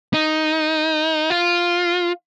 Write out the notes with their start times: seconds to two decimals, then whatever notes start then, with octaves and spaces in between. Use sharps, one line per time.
0.14 D#4
1.30 F4